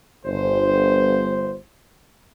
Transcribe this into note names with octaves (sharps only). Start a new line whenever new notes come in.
G1 C5